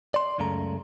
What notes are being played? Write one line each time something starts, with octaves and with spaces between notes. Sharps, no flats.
D5 C6
C#2 F#2 C#3 A3 A#5